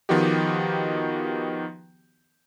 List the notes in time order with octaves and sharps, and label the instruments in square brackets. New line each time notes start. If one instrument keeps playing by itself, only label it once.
[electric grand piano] D#3 F3 B3 D#4 F#4 G4